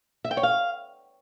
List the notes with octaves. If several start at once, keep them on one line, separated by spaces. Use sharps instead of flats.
E5
G5
C#5
F5